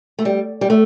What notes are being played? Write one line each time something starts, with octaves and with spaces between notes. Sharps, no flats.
A3
G3
G3
A3